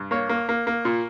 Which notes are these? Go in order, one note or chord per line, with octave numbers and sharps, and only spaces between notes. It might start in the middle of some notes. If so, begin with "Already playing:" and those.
Already playing: G2
A#3 C#5
A#3
A#3
A#3
A#2